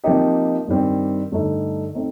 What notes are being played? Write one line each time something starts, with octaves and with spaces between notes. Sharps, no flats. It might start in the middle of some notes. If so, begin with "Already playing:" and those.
C3 F3 A#3 D#4 G4
G2 D#3 G3 C4
G2 D3 A3 D#4
A3 C4 D#4